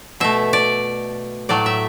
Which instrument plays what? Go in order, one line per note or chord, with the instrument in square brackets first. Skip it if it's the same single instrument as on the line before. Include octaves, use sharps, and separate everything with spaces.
[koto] B2 A3 E5
D5
A2 F#3 A3 D5
E5